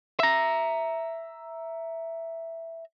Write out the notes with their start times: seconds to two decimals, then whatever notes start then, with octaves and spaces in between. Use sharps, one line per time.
0.20 E5 A#5